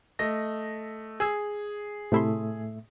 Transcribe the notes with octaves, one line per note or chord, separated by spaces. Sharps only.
A3 D#5 A#6
G#4 G#5 E6 G#6
A2 C3 A3 E4 E5 C6